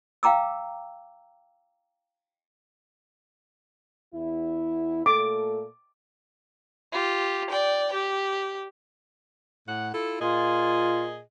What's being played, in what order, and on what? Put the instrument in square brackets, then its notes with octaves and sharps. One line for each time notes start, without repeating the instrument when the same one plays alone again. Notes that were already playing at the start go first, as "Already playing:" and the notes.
[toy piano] F5 G5 A#5 D6 E6
[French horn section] E2 E4
[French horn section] A#2 A3 A4 [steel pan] D6
[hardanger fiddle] F4 G4
D5 G5
G4
[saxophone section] A2 F#5
E4 F4 A4
[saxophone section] A#2 G#4 D#5 [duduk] F4